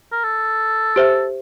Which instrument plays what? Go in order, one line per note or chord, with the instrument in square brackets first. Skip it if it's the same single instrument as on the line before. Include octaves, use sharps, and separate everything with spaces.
[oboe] A#4
A4
[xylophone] G4 C5 E5